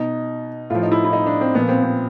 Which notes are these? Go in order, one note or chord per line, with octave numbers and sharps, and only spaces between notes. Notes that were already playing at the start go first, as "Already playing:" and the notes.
Already playing: B2 D#4
A2 F3 F4
D#4
E4
E4
D#4
D4
C4
A#2 F3 B3
C4
C4